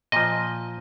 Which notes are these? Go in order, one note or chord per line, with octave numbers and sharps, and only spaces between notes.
A#2 F3 D#5